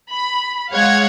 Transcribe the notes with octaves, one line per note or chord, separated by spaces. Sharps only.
B5
G#3 C#5 F5 F#5 G#6